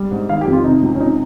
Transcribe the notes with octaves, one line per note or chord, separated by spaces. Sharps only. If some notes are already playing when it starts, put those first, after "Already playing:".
Already playing: G3
G#2
D#3 F5
G4
F2
F4
C3 D#4
C#2
C#4
C3 D#4